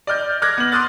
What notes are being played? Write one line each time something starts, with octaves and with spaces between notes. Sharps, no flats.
D5 D#5 F6 G6
D6 F6 F#6 G#6 A#6
B3 F#7
C6 D6 D#6 F6 F#6 A6